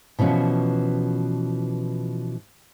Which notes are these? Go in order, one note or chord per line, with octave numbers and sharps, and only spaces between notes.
B2 E3 F3 C#4 F#4